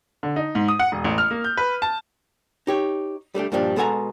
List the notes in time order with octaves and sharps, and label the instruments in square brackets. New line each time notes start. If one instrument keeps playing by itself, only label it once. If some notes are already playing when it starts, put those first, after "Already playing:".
[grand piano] D3
D#4
G#2
D#6
F#5
E1
A1
F6
A#3
G6
B4
A5
[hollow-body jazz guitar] D#4 G4 C#5
G3 A3 D4 G4
G2 A#2 F3 G3 D4
B2 G#3 A4 F#5 G#5 A#5